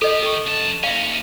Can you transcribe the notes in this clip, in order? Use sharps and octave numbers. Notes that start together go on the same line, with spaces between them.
D#3 G4 A4 D#5
A4 C#6
F#2 A5
D#2 C#4 E5 F5